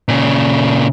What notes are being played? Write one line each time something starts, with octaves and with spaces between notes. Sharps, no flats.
A#2 C#3